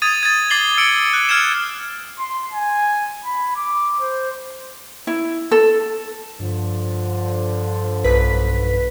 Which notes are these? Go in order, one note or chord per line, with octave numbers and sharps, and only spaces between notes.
D#6 G#6 A6 D#7
G#6 A6
D6 A6 C7 F#7 G7
E6 C#7 D7
F#6
F6 G#6 C#7 E7
C6
G#5
B5
D6
C5
E4
A4
G2 D3 F3
B1 B4 B6